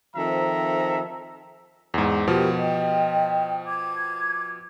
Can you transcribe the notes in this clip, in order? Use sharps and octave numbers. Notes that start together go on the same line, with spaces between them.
D#3 F3 C4 A4 E5 A#5
E2 G#2
B2 F3 G4 A#4
D#5 G5
D6 G#6